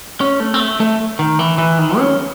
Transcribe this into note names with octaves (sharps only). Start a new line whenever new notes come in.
C#4
A3
C4
A3
A3
D#3
E3
E3
D#3
C#4